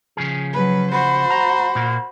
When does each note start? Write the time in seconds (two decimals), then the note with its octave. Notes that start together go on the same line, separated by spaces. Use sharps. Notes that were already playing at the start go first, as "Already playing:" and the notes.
0.17 C#3 F3 G#4
0.53 F#3 B4
0.92 F#4 C5 B5
1.30 A#5
1.75 A#2 A#3